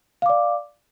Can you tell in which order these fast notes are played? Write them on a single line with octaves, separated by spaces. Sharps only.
F5 D6 D5